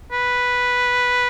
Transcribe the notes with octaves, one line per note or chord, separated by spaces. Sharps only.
B4